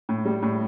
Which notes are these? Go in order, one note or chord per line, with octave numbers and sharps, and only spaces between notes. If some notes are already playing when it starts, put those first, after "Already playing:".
A2
G3
A2